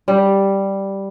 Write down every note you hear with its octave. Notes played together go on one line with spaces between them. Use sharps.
G3